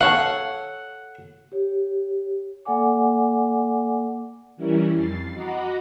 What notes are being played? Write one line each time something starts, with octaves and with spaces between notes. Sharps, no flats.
A4 C#5 F5 F#5
G4 C#5
A#3 A4 D5 F#5 G#5 D6
E3 G3 C#4 E4 A#4
F2 A6 C7
F#4 D#5 F#5 A#5 B5 D6